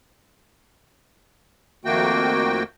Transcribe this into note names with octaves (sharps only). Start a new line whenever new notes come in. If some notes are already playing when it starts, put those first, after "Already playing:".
F2 D#3 A3 A#3 F#4 G5